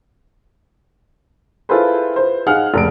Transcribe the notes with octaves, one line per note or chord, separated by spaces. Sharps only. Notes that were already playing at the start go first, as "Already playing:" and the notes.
E4 F4 G#4 A4 B4 C5
B4 C5
D#4 G#4 F5 F#5 F6
F1 C#2 D7